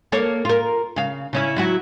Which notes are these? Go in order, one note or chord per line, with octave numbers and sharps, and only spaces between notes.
A#3 A4 C#5
F4 A#4
C#3 F5
C#3 C#4 E4
F#3 E4 F#4